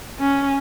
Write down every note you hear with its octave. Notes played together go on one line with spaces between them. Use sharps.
C#4